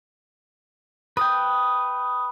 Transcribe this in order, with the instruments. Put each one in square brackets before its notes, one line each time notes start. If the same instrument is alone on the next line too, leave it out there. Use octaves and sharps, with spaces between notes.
[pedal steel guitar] B4 G5 [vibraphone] D#6